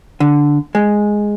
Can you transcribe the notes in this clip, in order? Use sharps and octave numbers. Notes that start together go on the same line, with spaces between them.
D3
G#3